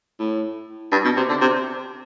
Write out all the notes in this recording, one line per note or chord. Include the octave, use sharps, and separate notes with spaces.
A2
G2
B2
C3
D3
C3